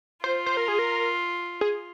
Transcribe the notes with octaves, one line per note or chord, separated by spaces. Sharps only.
F4 C5
C5
A#4
G#4
A#4
G#4